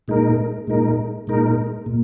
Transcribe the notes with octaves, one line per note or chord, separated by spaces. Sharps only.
A#2 G#3 D#4 A#4
A#2 G#3 D#4 A#4
A#2 G#3 D#4 A#4
A#2